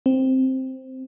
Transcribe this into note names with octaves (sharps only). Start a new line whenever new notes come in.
C4